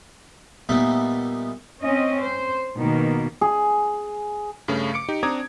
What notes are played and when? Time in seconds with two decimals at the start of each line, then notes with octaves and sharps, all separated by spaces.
0.69 A#2 G3 B3 D#4 E5
1.82 C4 C#4 D#5
2.21 C5
2.77 B2 D#3 A#3
3.41 G#4
4.68 G2 C#3 A3 C#4
4.94 D6 C#7 D7
5.09 D#4 G4
5.23 C4 D4 A#5 D6 D#6 G#6